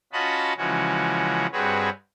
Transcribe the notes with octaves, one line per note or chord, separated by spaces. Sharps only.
C#4 F4 F#4 D#5 A5 B5
C#3 E3 F3 G#3 C#4 F#4
G2 C4 F#4 G#4 B4 C#5